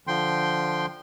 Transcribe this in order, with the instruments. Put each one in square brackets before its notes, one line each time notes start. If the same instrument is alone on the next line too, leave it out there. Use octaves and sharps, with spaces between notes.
[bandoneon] D3 F3 G5 C6